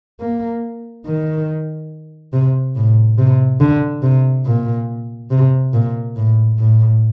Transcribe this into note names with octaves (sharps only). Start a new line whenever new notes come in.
A#3
D#3
C3
A2
C3
D3
C3
A#2
C3
A#2
A2
A2